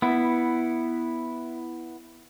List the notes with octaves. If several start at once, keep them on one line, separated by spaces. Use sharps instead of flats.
B3 E4